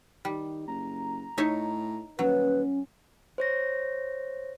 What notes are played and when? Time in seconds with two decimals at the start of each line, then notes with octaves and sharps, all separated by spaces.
0.25 D#3 G3
0.68 F#1 A#5
1.38 A2 D#4 C#5 E5
2.19 D#1 F#3 C#4 B4
3.38 C5 C#5 A#6